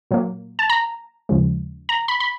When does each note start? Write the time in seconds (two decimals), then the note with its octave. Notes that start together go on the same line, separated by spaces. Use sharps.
0.11 A#2 F#3 A#3
0.59 A5
0.70 A#5
1.29 D#2 C#3 F3 G#3
1.89 A#5
2.08 B5
2.20 B5